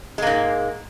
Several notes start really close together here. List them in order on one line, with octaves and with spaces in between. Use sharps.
G#3 A#3 G#2